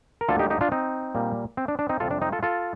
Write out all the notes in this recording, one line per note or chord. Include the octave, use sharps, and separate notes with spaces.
A#4
D2 D3 G3 A#3 F4 A4
D#4 G4
D#4 G4
D4 F4
C4 D#4
A#2 G3 A#3
C4
D4
D4
C4 D#4
F2 C3 G3 F4 A4
D4
C4 D#4
F4 A4
F4 A4